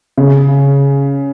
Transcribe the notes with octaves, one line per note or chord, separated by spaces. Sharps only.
C#3